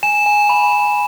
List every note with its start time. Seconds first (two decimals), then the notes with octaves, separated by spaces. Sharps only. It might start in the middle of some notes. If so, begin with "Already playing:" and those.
0.03 G#5 E7
0.26 G#5
0.49 B5
0.72 G#5